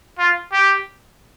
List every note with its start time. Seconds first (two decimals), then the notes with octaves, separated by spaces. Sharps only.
0.19 F4
0.52 G4